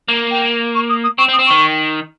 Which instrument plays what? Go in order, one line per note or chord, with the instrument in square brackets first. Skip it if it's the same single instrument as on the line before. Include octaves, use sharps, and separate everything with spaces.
[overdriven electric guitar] A#3
[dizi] G5
C#6
D#6
D#6
[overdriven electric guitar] C4 [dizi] C#6
[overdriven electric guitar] C4
[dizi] D#6
[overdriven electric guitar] C4
[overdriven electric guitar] D#3 [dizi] C#6